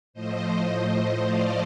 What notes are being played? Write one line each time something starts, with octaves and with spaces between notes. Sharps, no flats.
A2 F3 A3 C5 D#5
D5 F5